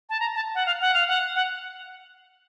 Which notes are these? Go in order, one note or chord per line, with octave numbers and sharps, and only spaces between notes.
A5
A#5
A5
F#5
F5
F#5
F5
F#5
F#5